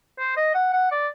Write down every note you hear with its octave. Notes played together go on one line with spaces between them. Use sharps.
C5
D#5
F#5
F#5
D5